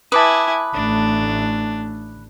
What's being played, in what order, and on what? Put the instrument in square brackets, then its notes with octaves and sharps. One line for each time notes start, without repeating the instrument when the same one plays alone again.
[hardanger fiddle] E4 G#5 [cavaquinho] B4 [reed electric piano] A5 D6 D#6
[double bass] A1 A3 [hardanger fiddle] D4